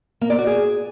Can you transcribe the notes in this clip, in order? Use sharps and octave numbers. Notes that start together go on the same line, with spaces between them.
A#3
D5
F#4
G#4